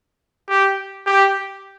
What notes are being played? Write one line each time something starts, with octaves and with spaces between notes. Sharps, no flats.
G4
G4